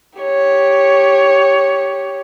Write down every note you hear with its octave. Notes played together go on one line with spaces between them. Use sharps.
G4 C#5